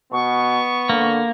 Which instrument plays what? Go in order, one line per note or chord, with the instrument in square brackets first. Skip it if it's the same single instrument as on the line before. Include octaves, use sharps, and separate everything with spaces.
[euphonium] B2 [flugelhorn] B3 [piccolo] C#6
[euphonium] D3 [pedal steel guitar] A#3